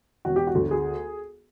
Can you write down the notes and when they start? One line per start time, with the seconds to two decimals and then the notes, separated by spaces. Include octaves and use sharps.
0.25 E1 F#4
0.36 G4
0.47 F#4
0.55 D2
0.71 G#4